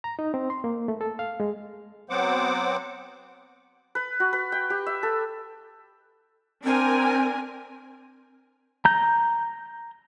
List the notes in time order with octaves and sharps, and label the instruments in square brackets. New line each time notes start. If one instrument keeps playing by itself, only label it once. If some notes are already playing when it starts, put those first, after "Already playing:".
[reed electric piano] A#5
D#4
C4
C6
A#3
A3
A4
F5
G#3
[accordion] F#3 B3 C4 C5 F#5 D6
[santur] B4
F#4
B4
G5
G4
E5
A4
[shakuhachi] C4 [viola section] D4 A#4 G#5
[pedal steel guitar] A#5 G6